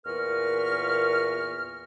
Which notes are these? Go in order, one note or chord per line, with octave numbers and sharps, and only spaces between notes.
E2 A#2 A#4 B4 C#6 F6